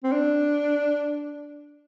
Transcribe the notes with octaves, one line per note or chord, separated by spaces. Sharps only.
C4
D4